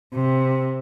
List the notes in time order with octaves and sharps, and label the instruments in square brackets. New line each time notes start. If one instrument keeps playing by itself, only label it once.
[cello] C3